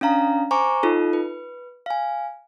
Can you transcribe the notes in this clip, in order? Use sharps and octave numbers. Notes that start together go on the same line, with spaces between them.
C#4 D4 F5 A#5
C5 G#5 A#5 C#6 D6
D#4 F4 A4
B4
F5 G#5